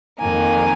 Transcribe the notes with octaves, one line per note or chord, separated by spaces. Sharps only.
F2 D#3 A#3 G#5